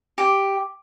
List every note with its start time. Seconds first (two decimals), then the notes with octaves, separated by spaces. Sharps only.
0.18 G4